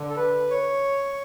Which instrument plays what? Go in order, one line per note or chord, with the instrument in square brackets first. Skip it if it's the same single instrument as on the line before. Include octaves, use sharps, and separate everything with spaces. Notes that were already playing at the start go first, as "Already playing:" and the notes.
Already playing: [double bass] D3
[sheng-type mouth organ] A4
B4
C#5